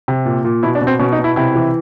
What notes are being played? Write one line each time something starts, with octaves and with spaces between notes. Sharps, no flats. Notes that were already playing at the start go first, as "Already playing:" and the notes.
C3
A#2
A#2
B2 E4
D4
B2
C4
B2 C#4
D#4
B2
E4
C3 E4
E3